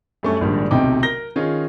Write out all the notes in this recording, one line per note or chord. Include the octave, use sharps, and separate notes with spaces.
F#2 G3 A3 C#4 C#6
A#1 G#2 D#3 G3 D4
D1 B1 C3 D#4 G5 D6
A#4 A#6 G7
D#3 C#4 F4 G#4 D#5